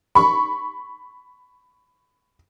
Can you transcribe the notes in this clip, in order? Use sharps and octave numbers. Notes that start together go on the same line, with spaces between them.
B5 C#6